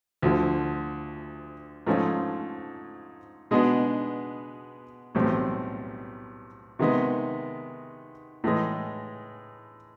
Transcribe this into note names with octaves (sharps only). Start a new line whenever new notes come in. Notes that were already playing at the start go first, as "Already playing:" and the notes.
D2 D3 F3
G#2 F3 A3 C#4 F4
B2 G#3 B3 D4
B1 A2 E3 G3 C4
C3 D#3 G#3 B3
A2 E3 G#3